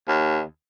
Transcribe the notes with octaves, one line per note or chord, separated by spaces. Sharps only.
D#2